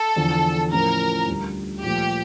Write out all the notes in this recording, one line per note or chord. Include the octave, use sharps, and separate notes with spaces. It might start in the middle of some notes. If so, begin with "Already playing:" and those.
Already playing: A4
E2 D3 F3
A2 F3 C#4 F4 A#4
D2 D3 G3
A#2 F3 A3 G4